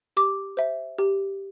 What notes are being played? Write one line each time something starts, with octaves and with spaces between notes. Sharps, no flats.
G4 D6
C5 E5
G4